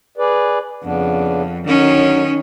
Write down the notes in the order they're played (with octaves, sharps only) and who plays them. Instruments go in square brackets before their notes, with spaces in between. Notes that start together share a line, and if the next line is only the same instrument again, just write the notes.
[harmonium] G#4 B4 D5
[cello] F2 [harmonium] C#3 B3 D4
[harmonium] D3 F#3 [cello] D#3 C#4